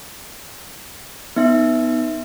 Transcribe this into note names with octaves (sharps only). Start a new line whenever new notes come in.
B3 D#4 E5